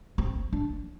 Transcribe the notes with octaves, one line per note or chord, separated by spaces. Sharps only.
C4
D4